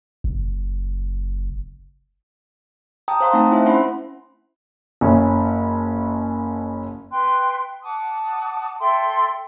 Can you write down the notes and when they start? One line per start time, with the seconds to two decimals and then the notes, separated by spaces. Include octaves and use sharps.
0.24 F#1
3.08 G5 A5 A#5 D#6
3.20 C5 F5 C6
3.33 A3 C4 D#4 G#5 A5
3.52 E4 C5 E5
3.65 C#4 C5 F#5 B5 C6
5.01 F#1 C#4
7.11 B4 G5 C6 F#6
7.82 F#5 A5 D6 D#6
8.80 A4 E5 G5 C6